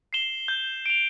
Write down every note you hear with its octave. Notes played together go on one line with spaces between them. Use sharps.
C7 E7 G7
G6
D7 F7